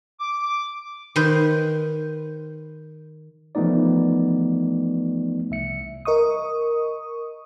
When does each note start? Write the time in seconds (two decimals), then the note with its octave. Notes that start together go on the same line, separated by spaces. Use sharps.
0.20 D6
1.16 D#3 B4 C5
3.55 E3 F3 A3 B3 D#4 D5
5.51 C2 E5 C#7
6.05 A#4 D#5 C#6 D#6